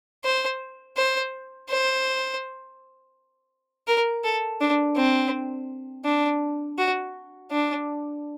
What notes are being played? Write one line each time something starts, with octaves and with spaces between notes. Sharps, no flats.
C5
C5
C5
A#4
A4
D4
C4
D4
F#4
D4